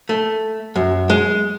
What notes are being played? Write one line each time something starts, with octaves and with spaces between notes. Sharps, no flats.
A3
F#2
G#3